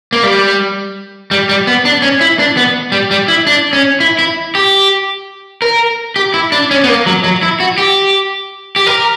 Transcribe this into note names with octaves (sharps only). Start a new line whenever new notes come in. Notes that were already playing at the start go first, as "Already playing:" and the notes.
A#3
G3
G3
G3
B3
D4
C#4
E4
D4
B3
G3
G3
E4
D4
C#4
E4
E4
G4
A#4
G4
E4
D4
C#4
B3
A#3
F#3
F#3
E4
F#4
G4
G4
A#4